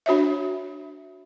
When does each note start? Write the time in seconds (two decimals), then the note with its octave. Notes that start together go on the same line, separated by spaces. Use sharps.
0.06 D4 F#4 C#5 E5